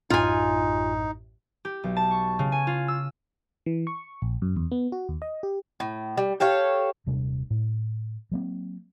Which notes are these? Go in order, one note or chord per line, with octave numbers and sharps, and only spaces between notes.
A1 F#2 A2 D#4 F4 G#5
G4
B1
A5
C#6
C#3
G#5
F4
E6
E3
C#6
A#1
F#2
E2
B3
F#4
D#2
D#5
G4
A2
G3
G4 A4 C#5 F5
D#1 C3 G3 D4
A2
F#3 A#3 C4